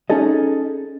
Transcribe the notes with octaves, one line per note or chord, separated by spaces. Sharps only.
C#4 D#4 G#4 A4 D#5